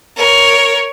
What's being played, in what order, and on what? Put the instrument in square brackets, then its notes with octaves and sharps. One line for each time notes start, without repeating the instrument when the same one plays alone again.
[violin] A#4 C#5